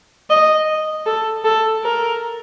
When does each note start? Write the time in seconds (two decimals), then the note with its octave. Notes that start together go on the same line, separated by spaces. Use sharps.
0.30 D#5
1.06 A4
1.45 A4
1.84 A#4